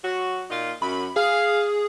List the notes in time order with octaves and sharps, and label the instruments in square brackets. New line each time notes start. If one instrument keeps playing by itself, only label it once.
[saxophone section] F#3 F#4
A#2 D#4 F4
[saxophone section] F#2 [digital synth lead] B5
[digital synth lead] G#4 [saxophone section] F5